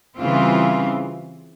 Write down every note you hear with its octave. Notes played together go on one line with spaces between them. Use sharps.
C#3 E3 G3 C4 F4